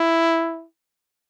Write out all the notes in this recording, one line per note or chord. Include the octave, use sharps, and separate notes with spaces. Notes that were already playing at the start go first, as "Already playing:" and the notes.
Already playing: E4